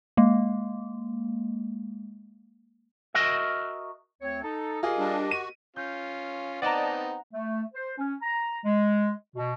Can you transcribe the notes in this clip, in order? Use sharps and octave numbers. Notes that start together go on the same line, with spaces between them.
G#3 A#3
F#4 A#4 D#5 E5
D2 C4 C#5
D#4 A4
F4 G4 G#4 A#4 D#5
G3 D4
F#4 D#7
C#4 F4 G6
B3 C4 D#4 D5 D#5 F#5 A5 A#5
A3
C5
C#4
A#5
G#3
B2